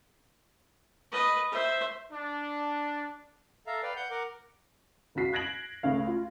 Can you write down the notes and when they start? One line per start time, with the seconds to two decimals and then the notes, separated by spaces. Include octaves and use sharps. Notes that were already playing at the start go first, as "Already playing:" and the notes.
1.12 B4 D#5
1.52 C5 E5
2.12 D4
3.67 A4 E5 F5 A#5
3.83 B4 D5 F5 G5
3.96 F#5 G6
4.11 A#4 F#5 D6
5.15 C#2 C#3 F#4 B6 C7
5.33 F#6 G#6 A#6 D7 F#7
5.83 C#2 C#3 A3 F5
6.07 F4